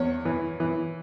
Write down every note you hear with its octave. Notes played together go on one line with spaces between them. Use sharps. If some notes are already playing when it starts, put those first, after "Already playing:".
Already playing: E2 C#5
E3
E3